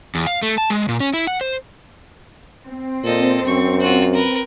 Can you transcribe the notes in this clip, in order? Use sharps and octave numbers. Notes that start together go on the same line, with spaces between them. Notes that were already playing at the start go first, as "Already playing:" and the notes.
E2
F5
A3
A5
G#3
A#2
C#4
E4
F#5
C5
C4
A#2 A4 D#5
F#2 C#6
F4 F#4
A#4 B4